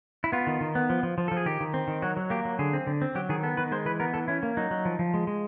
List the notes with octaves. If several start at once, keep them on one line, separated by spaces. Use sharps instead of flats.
E4
B3 F4
D#3
D#3
B3
F3
F3
F3
F3 A4
G#4
D#3 G4
D#3
C4
D#3
F#3 F#4
F#3
A#3 G4
F#3
D3 G#4
C4
D3
C4
F#3 G4
D#3 G#4
B3 A4
D#3 B4
G#3 C5
E3 B4
B3 A#4
E3 A4
C#4 E4
A#3
F#3 D#4
F#3
F3
F3
G#3
G#3